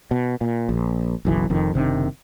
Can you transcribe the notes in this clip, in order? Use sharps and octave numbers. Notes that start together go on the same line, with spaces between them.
B2
A#2
A#1
F#1 B1 E3
F1 F2 D#3
F#1 C3 D#3 D4